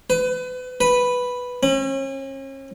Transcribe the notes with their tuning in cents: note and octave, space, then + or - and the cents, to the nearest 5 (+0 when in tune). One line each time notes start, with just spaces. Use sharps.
B4 +35
B4 +0
C#4 -40